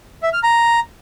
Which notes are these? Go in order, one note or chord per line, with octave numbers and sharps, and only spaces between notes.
E5
F6
A#5